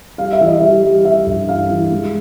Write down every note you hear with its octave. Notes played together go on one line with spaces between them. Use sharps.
G3 F5
E5
E3
D#5
G3 E5
G3
G3 E5
G2
E3 F5
E3
G#3